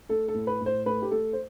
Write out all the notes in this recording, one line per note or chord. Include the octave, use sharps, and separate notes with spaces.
A3 A4
A4
A2
B4
A2
C5
A3 B4
G4
A3 A4
C5